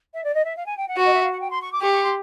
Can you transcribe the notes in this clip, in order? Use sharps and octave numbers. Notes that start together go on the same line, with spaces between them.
E5
D5
D#5
E5
F5
G#5
G5
F#5
F#4
D#5
E5
F5
F#5
G5
C6
C#6
D6
G4 C#6
C#6
C6